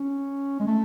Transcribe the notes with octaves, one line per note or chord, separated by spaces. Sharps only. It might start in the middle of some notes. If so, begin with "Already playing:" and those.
Already playing: C#4
G#3
A3